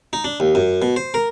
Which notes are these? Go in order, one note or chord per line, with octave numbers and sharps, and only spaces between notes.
D#4
D4
D#2
F#2
B2
C5
A#4